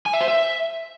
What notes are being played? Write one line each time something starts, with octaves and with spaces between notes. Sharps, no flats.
G#5
E5
C5
E5